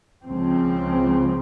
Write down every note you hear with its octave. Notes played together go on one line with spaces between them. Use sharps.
C#2 C#3 F3 C4